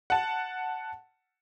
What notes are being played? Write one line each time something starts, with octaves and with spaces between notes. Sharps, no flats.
F#5 A5